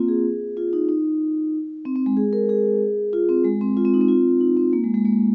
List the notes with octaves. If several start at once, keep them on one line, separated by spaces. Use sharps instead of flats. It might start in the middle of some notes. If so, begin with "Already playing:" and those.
Already playing: A#3 C4 F4
G#4
F4
D#4
D#4
C4
C4
G#3
G#4
A#4
G#4
F4
C4
G#3
C4
F4
C4
D#4
C4
F4
D#4
C4
A#3
G#3
G#3
A#3